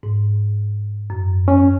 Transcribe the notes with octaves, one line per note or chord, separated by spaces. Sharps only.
G#2
F#2
C#4